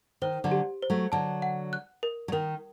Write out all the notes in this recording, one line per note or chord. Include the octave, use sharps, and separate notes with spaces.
D#3 C5
D3 F#3
G4
C5
F#3 A3
D3 F#3 A5
F#5
F#6
A#4
F#3
D#3 A#4